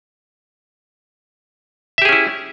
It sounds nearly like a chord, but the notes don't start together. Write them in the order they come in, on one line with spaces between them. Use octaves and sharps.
E5 G4 G#4 C#4 E4